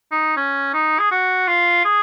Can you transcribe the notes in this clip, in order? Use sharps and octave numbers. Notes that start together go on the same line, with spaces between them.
D#4
C#4
D#4
G#4
F#4
F4
G#4